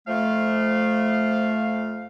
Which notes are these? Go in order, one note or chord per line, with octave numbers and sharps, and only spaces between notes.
F2 F3 A3 F5